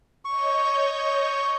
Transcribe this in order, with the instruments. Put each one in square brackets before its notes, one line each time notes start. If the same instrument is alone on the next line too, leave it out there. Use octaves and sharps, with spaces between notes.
[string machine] C#5 D#5 G6 [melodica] C#6